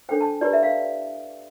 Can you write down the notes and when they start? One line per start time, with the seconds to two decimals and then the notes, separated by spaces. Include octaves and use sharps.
0.09 D4 A4 C5 G5
0.21 A5
0.41 E4 G4 B4 D5
0.53 E5
0.63 F5